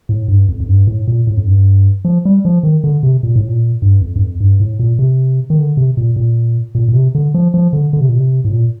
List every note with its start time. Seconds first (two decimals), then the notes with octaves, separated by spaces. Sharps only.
0.09 A2
0.28 G2
0.49 F2
0.60 F2
0.69 G2
0.87 A2
1.08 A#2
1.27 A2
1.37 F2
1.47 G2
2.05 F3
2.25 G3
2.45 F3
2.63 D#3
2.84 D3
3.03 C3
3.23 A#2
3.36 A2
3.48 A#2
3.82 G2
4.02 F2
4.16 G2
4.21 F2
4.40 G2
4.60 A2
4.79 A#2
4.99 C3
5.50 D#3
5.58 D3
5.77 C3
5.97 A#2
6.16 A#2
6.75 A#2
6.89 A#2
6.94 C3
7.15 D3
7.34 F3
7.54 F3
7.73 D3
7.93 D3
8.00 C3
8.09 A#2
8.15 C3
8.45 A2
8.51 A#2